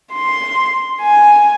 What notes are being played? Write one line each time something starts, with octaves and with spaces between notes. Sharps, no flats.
C6
G#5